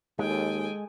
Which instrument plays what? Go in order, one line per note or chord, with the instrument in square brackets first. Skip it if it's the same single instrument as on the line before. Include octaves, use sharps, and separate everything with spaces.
[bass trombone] D#2 [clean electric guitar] G#3 [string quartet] A4 G5 G#5